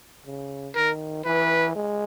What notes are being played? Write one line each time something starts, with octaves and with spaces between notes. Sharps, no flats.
C#3
D#3 A#4
E3 B4
G#3